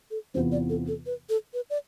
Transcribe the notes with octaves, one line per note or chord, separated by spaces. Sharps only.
A4
E2 C3 E3 B3 F4 C5
D5
A4
A4
B4
A4
B4
D5